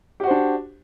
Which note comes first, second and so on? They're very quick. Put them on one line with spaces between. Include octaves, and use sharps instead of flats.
G4 F#4 C5 D4